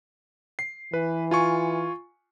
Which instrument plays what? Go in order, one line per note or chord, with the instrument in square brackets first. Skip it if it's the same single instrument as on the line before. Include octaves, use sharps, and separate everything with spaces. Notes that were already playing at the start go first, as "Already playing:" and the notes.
[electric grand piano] C7
[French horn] E3 [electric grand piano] B4
[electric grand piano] F4 G#5 C#6